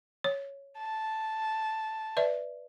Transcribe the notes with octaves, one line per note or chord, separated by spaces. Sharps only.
C#5
A5
B4 D5 E5